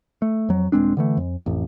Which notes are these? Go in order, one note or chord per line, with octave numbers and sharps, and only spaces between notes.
A3
F2 F#3
D#1 G#3 C4 D4
D3 E3 A3
F2
A1 F2